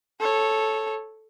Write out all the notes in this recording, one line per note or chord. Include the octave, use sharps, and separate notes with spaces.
A4 C#5